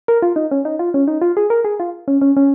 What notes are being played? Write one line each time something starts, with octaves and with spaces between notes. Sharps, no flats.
A#4
F4
D#4
C#4
D#4
F4
C#4
D#4
F4
G#4
A#4
G#4
F4
C#4
C#4
C#4